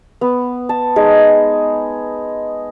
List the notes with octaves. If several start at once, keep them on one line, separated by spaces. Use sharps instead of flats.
B3
A5
G#3 D#4 G#4